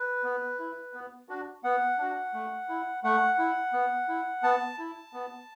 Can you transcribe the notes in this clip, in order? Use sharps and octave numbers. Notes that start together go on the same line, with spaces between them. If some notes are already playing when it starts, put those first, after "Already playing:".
Already playing: B4
B3
E4
B3
D4 F#4
B3 F#5
D4 F#4
A3
E4
A3 F#5
E4
B3
E4
B3 A5
E4
B3